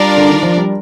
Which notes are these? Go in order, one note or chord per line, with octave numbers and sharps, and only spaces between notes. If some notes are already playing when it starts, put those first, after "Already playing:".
Already playing: G3 D4 F4 A#4 D5
D3
D#3
F3
G3